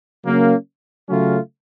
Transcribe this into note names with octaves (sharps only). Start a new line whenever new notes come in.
C#3 F#3 A#3 C#4
C#3 F#3 A3 C#4 F4